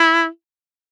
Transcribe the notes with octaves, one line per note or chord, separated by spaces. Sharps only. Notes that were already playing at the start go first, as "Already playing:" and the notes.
Already playing: E4